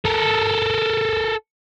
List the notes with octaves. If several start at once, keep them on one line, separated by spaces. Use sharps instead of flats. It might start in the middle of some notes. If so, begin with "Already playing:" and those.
A4 A#4